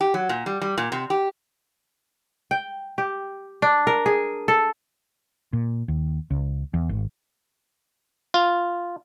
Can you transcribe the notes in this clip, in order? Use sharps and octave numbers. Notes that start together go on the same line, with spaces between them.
G4
F#3
A#2
G3
G3
A#2
C3
G4
G5
G4
D4
A#4
G#4
A4
A#2
D#2
C#2
E2
G#1
F4